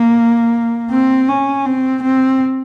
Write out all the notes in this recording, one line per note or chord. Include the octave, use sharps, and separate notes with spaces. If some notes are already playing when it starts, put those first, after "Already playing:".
Already playing: A#3
C4
C#4
C4
C4